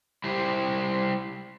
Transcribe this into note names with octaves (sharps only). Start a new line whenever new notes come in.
G3 E4 G4 C5